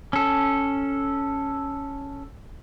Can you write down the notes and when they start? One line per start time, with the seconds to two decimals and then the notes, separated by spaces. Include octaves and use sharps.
0.13 C#4 A4